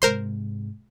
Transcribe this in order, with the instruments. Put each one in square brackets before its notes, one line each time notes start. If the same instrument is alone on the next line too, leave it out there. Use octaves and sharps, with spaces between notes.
[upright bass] G#2 C3 [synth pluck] A#4 C5 C6